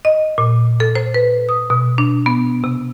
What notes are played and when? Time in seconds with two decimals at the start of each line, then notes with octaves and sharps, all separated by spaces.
0.05 D#5
0.38 A#2
0.80 A4
0.95 C5
1.14 B4
1.49 D#6
1.70 B2
1.98 D4
2.26 B3
2.64 C3